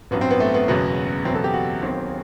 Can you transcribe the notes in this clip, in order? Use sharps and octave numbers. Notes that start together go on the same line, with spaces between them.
A1 G2 F#3 B3
C4
B3
A3
B3
F#1 E2 B2 F#3 B3
F#1 E2 B2 F#3 C4
A4
G4
F#4
E1 D#2 D#3 F#3 C4